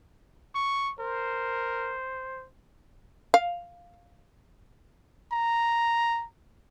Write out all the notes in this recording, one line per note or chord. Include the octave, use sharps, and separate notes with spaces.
C#6
A#4 C5
F5
A#5